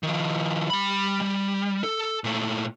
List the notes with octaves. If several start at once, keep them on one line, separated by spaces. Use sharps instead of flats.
D#3 F3
G3 B5
G3
A4
A#2 A3